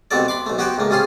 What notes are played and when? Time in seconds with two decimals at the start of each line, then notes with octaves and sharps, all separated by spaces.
0.11 C2 B2 B3 C4 A4 D5
0.28 B5 C6 D6
0.46 B1 A3
0.58 B3 F#4 G4 B4 C5 G5
0.78 C#2 A2 A#3
0.90 C3 G3 C#4 F4 G#4 C6